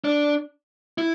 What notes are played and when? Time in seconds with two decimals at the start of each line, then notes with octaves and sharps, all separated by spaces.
0.04 D4
0.98 E4